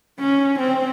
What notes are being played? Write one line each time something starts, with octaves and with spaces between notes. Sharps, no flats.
C#4
C4